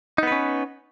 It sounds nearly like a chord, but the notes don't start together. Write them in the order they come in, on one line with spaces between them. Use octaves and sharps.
D#4 B3 B4 C#4